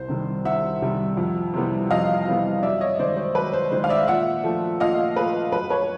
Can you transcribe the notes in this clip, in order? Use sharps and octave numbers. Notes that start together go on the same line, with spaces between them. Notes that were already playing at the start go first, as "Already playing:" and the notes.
Already playing: C2 C5
C3 D#3 G3
C2 E5 F#5
C3 D#3 G3
F2
C3 E3 G3 B3
F2 D#5 F5
C3 E3 G3 B3
F#2 D5 E5
C#5 D#5
D#3 G#3 C5 D5
C5
F#2 B4
C5
D#3 G#3 C5
F5
D5 E5
A#2 E5 F#5
F3 A3
A#2 D#5 F5
F3 A3 B4
F#2 B4
B4 C#5